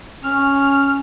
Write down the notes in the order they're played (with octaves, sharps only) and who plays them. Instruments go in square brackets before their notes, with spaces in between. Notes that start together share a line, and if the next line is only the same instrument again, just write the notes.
[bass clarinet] C#4 [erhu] F6